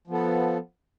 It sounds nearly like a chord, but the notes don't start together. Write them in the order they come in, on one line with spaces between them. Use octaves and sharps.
F3 B3 A4